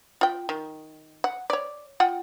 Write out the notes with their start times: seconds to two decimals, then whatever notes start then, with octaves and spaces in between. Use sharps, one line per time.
0.21 F4 G5
0.49 D#3
1.24 F#5
1.50 C#5 D5
2.00 F4 F#5 G5